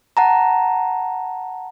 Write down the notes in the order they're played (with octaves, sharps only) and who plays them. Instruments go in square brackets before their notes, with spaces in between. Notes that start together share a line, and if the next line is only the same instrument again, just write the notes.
[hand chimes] F#5 A5 A#5